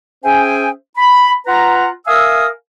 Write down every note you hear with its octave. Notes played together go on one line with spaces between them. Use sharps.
C#4 G#4 C5 E5 G5 G#5
B5
F4 B4 F#5 A#5
A#4 E5 F5 G#5 D#6 E6